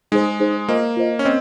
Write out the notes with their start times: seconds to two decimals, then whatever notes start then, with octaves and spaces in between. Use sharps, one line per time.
0.12 G#3 D#4 G#4 C5
0.40 D#4 G#4 C5
0.68 A#3 F4 C5 D#5
0.97 F4 C5 D#5
1.19 C#4
1.25 C4 D#5